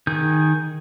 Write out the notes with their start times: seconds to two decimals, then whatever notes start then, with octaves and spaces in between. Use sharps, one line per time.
0.07 D#3 G#4 G6